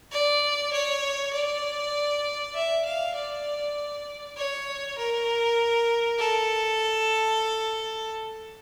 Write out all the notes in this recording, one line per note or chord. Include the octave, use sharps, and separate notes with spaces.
D5
C#5
D5
E5
F5
D5
C#5
A#4
A4